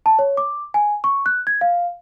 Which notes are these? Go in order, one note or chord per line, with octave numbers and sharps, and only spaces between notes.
A5
C#5
D6
G#5
C#6
F#6
G#6
F5